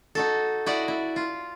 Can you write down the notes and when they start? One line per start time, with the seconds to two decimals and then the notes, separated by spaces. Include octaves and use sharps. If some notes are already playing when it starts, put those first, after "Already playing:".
0.15 D#4 F#4 A4
0.66 E4 F#4 D5 D#5 F#5
0.88 E4
1.16 F4